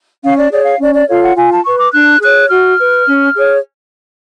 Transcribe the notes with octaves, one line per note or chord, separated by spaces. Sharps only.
C#4 F5
D5
G#4 C#5 D5
F5
C#4 D5
D5
F4 A4 C#5 F5
F#5
F4 G#5
A5
B4 C#6
D6
D4 F#6
G#4 C#5 F#6
F#4 F6
B4
C#4
G#4 C#5